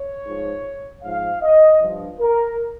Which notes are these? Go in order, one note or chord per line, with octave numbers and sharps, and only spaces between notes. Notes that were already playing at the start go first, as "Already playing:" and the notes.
Already playing: C#5
G#2 F3
G#2 F3 F5
D#5
G2 F3
A#4